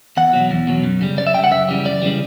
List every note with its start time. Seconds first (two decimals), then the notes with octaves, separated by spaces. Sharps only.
0.17 E2 F#5
0.33 B2 F#3
0.51 E2
0.67 B2 F#3
0.84 F#2
1.01 C#3 G3
1.18 F#2 D5
1.27 E5
1.34 C#3 G3 G5
1.44 F#5
1.51 F#2 E5
1.69 C#3 E3 G3
1.85 F#2 D5
2.02 C#3 E3 G3